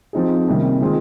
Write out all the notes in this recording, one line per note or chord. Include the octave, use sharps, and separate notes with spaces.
F3 C4 D#4 G#4
C3 D#3 G3 A#3 C#4
D#3 G#3 C4 F4 G#4